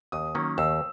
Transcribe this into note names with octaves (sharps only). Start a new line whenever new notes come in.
D#2 D#6
D#3 F#3 A#3 C#4
D#2 E6